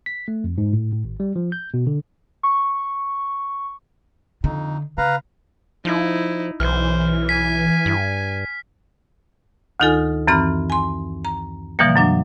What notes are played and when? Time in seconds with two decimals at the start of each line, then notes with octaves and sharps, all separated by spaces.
0.06 B6
0.28 A3
0.44 F2
0.58 G#2
0.73 A2
0.92 A2
1.04 G#1
1.20 G3
1.36 F3
1.52 G6
1.74 B2
1.87 D3
2.43 C#6
4.44 F2 D3 D#4
4.98 C#3 B4 F5 A#5
5.85 F3 D#4 E4
6.60 B1 E3 C5 F6
7.29 G#5 B6
7.86 G2
9.80 D2 D#3 D#4 F4 A4 G#5
10.27 F#2 E3 C4 B5 F6
10.70 G#5 C6
11.25 A#5
11.79 B2 D3 E3 F3 G3 A#3
11.96 F#2 F#3 D4